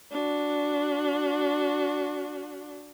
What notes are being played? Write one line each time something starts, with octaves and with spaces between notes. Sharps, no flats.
D4 F#4